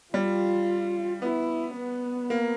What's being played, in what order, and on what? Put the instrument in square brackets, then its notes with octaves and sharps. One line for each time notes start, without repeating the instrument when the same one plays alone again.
[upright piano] G3 [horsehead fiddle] F4
[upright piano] B3 [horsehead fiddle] E4
[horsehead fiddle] B3
[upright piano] A#3